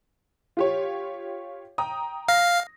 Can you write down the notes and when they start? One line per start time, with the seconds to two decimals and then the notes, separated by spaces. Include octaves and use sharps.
0.57 F4 G4 C#5
1.78 G5 A#5 D#6
2.28 F5 A#6